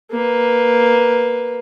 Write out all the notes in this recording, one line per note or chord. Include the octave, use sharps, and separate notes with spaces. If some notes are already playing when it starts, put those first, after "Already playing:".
A#3 B4